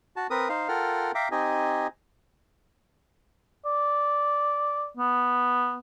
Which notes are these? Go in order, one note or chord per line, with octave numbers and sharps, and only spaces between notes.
F#4 A5
C4 A#4 B4 D#6
D#4 C5 F5
F4 A4 A#4 F#5 G5 F6
E5 F5 G5 A#5 D6
C4 D#4 G4 D#5 G#5
D5
B3